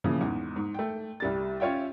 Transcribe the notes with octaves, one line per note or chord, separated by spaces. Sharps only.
A#2 C#3 E3 F3
E2 G#2
G#2
A3 G5
C2 G3 A6
C#4 F4 C#5 E5 G5